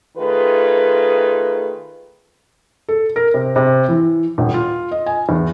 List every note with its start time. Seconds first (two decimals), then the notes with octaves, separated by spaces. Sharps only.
0.17 D#3 A3 F4 G#4 B4
2.89 A4
3.16 A#4
3.34 C3
3.56 C3
3.89 E3
4.38 D#1
4.54 F4
4.92 D#5
5.06 G#5
5.29 E2